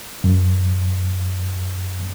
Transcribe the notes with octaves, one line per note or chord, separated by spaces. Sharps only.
F#2